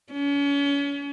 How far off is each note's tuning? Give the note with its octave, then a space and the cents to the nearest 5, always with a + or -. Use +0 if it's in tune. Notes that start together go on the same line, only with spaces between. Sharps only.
C#4 +35